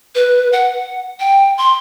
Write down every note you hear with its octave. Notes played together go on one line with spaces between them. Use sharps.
B4
F#5
G5
C6